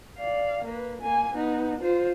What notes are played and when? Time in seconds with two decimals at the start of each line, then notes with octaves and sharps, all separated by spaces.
0.18 D5 F5
0.64 A#3 B4
1.01 A#3 G#5
1.35 B3 D#4
1.81 F4 C5